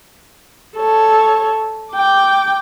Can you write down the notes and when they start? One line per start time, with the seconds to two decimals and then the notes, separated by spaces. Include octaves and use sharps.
0.76 A4 C#5
1.93 G5 D6